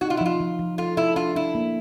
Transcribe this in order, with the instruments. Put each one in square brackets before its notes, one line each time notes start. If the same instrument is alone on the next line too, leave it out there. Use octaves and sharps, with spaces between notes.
[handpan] D#4 [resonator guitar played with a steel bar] F#4
[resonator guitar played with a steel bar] F4
E4
[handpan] F3 [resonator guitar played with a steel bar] F4
[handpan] F3
F3
[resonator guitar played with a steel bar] F4 [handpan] A4
[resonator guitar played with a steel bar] E4 [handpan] A4
[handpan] D4 [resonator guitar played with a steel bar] F4
[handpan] D4 [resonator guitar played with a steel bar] E4
[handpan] A#3